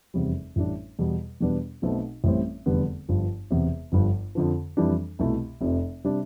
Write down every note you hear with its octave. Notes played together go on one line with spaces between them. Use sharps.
F1 E2 C3 G3 C4
A1 A2 G3 D4
E2 B2 G3
E2 B2 G3 B3 D4
B1 B2 A3 C4
A1 A2 E3 G3 C4
F1 E2 D3 G3 B3
G1 G2 F3
E1 E2 C3
G1 G2 F3
F2 D3 F3
F2 E3 G3 D4
C2 B2 A3 E4
F1 F2 C3
C3 G3 D4